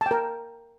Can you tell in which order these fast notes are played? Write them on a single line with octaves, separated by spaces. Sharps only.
A5 G5 A#4